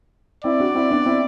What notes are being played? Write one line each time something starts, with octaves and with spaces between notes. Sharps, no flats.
C4 E4 D5
D4 F#4
C4 E4
B3 D4
C4 E4